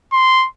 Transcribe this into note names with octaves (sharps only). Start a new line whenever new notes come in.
C6